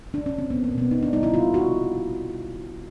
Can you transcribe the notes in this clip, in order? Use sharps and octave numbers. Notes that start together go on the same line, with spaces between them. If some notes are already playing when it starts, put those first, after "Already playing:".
D4
C#4
C4
A#3 B3
A#3
B2
B3
B2 D#4
D4
G3 D#4
E4
A#3 F4
C3 F#4